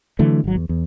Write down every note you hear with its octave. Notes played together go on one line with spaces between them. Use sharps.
D3 E3 F#3 A3
G#1 F#3
E2
E2